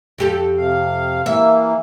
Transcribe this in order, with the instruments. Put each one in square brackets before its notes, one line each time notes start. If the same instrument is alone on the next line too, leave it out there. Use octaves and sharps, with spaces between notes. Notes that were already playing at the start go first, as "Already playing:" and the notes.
[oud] F2 G4 A4
[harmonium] C3 F5
[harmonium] E3 A#3 [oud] E5